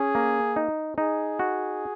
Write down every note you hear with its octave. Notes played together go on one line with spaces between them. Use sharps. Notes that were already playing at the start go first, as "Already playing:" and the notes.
Already playing: C#4 G#4
A#3
D#4
D#4 G#4
F#4